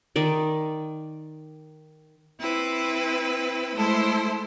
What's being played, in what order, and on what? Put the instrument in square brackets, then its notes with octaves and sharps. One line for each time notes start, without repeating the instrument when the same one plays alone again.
[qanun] D#3 D5
[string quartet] C4 E4 B4
G#3 A3 E4 A4 C5